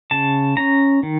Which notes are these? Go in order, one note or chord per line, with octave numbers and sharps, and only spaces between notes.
C#3 A5
C#4 A#5
D#3